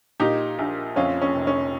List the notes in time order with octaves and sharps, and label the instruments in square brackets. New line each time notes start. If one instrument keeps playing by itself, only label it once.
[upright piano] A#2 D#4 G4
A#1
F2 C#4 F4
C#4
F1
C#4